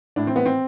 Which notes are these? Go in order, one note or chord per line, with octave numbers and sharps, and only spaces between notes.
A2 D4
C4
B3
C4